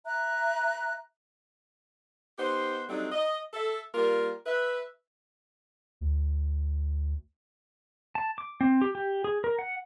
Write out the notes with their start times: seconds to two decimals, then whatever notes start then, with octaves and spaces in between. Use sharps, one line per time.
0.06 E5 A#5 F#6
2.38 B3 D#4 G4 C5
2.89 F#3 G3 A3 C4 D4 D#4
3.12 D#5
3.53 A4 E5
3.95 G3 A#3 F4 A#4
4.46 B4 E5
6.01 D2
8.15 A5
8.38 D6
8.61 C4
8.82 G4
8.95 G4
9.24 G#4
9.44 A#4
9.59 F#5